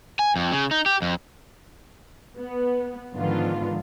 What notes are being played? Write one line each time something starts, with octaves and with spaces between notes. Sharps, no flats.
G#5
F2
C#3
D#4
G4
F2
B3
G#2 D3 D#3 F3 B3 F4